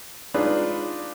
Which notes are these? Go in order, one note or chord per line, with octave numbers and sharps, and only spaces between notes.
D4 D#4 F4 G#4 B4